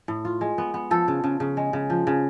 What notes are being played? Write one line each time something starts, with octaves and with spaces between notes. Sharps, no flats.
A2
F4
G#3
B3
B3
F3 A4
C#3
C#3
C#3
G#3
C#3
F3
C#3